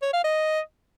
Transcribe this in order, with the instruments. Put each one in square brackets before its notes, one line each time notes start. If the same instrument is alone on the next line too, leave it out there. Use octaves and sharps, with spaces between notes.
[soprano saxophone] C#5
F5
D#5